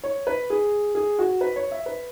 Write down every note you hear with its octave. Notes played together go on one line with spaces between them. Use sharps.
C#5
B4
G#4
G#4
F#4
B4
C#5
E5
B4